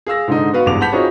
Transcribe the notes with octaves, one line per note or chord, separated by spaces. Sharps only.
G#4 F5 E6 A#6
G#2 D3 D#4
B3 F#4 B4 F5
G#1 E2 G2 G#4 D6 F7
F#5 A5 B5 G6 B6 F7
C4 D#4 F4 F#4 G#4 C#5